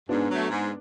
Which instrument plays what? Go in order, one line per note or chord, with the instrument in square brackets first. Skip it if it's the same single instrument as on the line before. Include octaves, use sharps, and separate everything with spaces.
[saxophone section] G#2 [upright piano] B3 D4
[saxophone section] F#3 A3
G#2